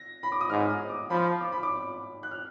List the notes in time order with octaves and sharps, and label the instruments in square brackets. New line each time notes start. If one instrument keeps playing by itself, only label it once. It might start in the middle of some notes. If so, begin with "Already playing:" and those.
Already playing: [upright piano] A#6
B5
D6
D#6
[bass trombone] G#2 [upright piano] F6
[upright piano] D#6
D6
[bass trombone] F3 [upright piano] B5
[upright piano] D6
B5
D6
F#6
F6